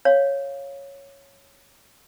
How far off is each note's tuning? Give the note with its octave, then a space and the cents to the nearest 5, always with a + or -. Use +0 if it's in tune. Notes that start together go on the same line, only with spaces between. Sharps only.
C#5 -5 F5 +0